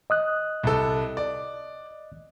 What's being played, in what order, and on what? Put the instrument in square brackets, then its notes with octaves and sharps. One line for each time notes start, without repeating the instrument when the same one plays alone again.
[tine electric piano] D#5 D#6 F#6
[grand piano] C2 A4
D5